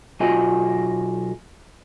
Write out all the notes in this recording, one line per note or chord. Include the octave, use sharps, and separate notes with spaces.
B1 F4 F#4 D#5 G#5